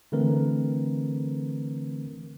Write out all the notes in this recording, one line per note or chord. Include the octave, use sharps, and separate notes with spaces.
D3 E3 A3 C4 A#4 B4